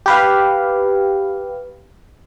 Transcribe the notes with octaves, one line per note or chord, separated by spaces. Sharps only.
G4 B4 F5